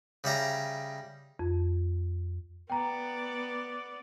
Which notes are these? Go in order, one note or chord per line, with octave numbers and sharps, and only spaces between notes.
C#3 G3 E5 A#5
F2
B3 D5 G5 A#5